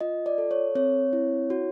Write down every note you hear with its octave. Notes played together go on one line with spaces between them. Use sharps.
F4 D#5
D5
A4
C#5
C4 C#5
E4
F#4